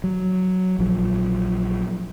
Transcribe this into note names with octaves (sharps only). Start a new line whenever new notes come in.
F#3
A#1 F3 F#3